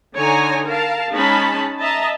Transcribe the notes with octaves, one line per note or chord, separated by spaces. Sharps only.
D3 D#4 C#5 G#5 A#5
A#4 F5 A5
G#3 C#4 D#4 A5 B5
D#5 E5 A5 A#5